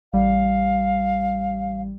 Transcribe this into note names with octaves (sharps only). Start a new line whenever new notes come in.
A1 G3 F5